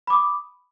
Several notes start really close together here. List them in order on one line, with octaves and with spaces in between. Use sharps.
B5 D6 D#6